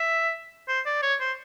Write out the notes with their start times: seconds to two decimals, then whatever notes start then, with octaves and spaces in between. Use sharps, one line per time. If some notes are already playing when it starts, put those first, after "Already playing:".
Already playing: E5
0.68 C5
0.86 D5
1.02 C#5
1.20 C5